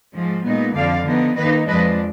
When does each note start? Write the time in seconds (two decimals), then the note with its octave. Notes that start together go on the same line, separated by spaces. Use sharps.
0.14 G#2 F3 G#3
0.45 A#2 G#3 B3 D#4
0.75 F2 D3 F3 D5 F5
1.06 D3 F3 B3 D#4
1.37 D#3 A#3 D#4 B4 D#5
1.67 F2 F3 G#3 D4 B4 D#5